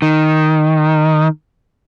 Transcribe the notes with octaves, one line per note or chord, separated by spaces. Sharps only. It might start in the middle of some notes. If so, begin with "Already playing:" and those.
D#3